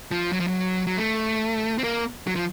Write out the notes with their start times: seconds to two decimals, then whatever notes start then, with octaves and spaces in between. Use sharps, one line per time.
0.11 F3
0.33 F#3
0.40 F3
0.48 F#3
0.87 F#3
0.97 A3
1.78 C4
1.84 A#3
2.27 F#3
2.36 F3